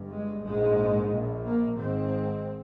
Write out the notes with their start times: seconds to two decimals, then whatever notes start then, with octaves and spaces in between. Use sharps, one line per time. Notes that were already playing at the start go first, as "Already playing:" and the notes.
Already playing: G1 G2
0.11 G#3
0.44 A#1 G#2 G#3
1.12 A#1 A#2
1.46 A#3
1.79 G#1 G#2 C4